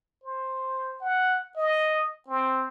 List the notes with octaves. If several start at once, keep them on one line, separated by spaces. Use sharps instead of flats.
C5
F#5
D#5
C4